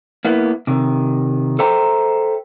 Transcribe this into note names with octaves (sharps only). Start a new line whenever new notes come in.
A#3 B3 E4
C3 D#3
A4 C5 E5 G5 A#5